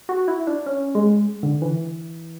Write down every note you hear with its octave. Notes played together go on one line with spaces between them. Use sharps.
F#4
E4
D4
C#4
G#3
D3
E3